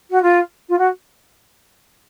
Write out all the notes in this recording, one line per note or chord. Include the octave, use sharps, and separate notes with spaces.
F#4
F4
F4
F#4